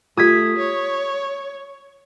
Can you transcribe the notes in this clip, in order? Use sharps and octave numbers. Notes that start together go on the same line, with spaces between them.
A3 F4 G4 D#6 G#6 B6
C#5